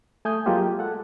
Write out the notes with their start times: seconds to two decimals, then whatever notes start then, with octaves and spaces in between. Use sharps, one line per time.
0.25 A3 G#5 D#6 G6
0.46 F#3 G#3 A#3 F4 G4
0.79 A4 F#5